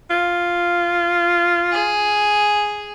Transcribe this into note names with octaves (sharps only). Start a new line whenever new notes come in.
F4
G#4